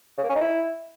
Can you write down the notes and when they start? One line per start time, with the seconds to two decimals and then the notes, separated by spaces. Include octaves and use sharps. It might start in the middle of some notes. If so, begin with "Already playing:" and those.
0.18 C#3
0.23 A#3
0.29 C#4
0.35 D#4
0.41 E4